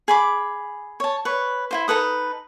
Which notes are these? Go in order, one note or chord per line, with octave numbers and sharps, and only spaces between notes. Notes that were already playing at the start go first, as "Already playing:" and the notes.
G#4 B5 D6
C#5 A5
B4 C#5
E4 F4 C5
D#4 A4 B4 D#6